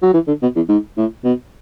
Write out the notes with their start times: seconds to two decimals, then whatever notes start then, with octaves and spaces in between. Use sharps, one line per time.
0.02 F#3
0.14 E3
0.27 D3
0.42 B2
0.56 E2
0.69 G#2
0.97 A2
1.24 B2